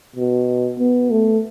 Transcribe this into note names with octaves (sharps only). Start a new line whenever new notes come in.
B2
B3
A3